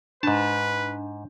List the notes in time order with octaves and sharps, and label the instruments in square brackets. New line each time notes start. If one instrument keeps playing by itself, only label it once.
[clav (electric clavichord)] G#2 A5 [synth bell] D4 [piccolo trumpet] B4